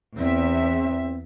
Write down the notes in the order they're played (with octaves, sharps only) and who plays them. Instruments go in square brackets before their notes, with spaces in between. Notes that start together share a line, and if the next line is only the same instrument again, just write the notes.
[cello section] E2 E5 [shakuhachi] C4